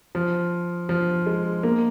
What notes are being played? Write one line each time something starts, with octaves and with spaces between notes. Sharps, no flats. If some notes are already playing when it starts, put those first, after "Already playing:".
F3
F3
G#3
A#3